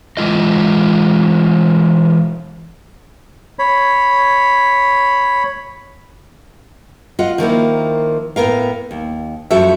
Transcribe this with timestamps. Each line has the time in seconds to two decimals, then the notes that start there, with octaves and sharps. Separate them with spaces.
0.17 E3 G#3 F4 D#5
3.59 C#5 B5
7.19 F4 D#5 F#5
7.38 D#3 F3 A#3 E4
8.36 A2 B3 A#4 F5
8.91 D#2
9.51 F#2 F3 A3 F#4 A4 E5